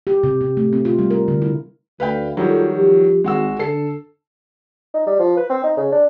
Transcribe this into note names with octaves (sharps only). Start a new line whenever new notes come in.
G4
C3
C3
A3
C4
F4
G3
A#4
D3
E4
D2 B4 F5 G5
D#3 F#3 G3 F4 A4
F3 G4
G#1 G#3 F#4 E6
D3 A4 C7
D#4
G3
F3
B4
C4
D#4
C#3
D4